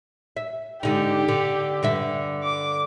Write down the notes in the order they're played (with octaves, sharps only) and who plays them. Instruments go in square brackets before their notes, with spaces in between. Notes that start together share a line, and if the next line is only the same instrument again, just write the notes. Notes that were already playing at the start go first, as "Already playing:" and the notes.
[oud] E5
[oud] G#2 D3 D#4 [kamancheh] G4
[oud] D3
G2 D3 E5
[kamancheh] D6